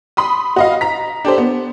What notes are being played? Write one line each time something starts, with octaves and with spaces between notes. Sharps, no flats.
B5 C6 D#6
F#4 D#5 F5
A#5 B6
D4 G4 A4 C5
B3